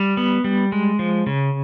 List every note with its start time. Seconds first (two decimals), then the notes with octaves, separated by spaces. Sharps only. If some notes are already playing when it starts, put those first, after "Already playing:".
Already playing: G3
0.17 B3
0.44 G3
0.72 G#3
0.99 F3
1.27 C#3